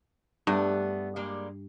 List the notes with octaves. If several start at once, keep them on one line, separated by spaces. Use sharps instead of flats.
G2 A3 B3 D4
G3 G#3 A#3